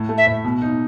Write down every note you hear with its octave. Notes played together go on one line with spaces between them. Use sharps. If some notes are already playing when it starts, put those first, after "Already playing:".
Already playing: A2
A3
E5
A2
B2
D#4